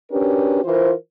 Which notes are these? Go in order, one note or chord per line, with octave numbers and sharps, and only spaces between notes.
C#4 D4 F#4 G4 A#4 B4
E3 F4 A#4 C5